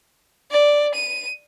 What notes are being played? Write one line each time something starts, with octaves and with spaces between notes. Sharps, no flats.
D5
D#7